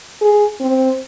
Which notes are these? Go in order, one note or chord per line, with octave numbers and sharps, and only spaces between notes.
G#4
C4